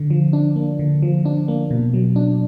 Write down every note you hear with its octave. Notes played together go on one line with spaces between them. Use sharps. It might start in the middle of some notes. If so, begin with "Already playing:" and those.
Already playing: D3
F3
D4
A#3
D3
F3
D4
A#3
B2
F#3
D4